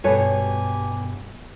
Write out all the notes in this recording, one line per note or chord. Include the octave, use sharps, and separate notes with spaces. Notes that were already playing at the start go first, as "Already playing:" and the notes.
G2 B2 G4 A4 B4 C#5 G#5